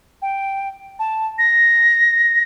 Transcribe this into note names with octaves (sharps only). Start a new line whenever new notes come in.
G5
A5
A#6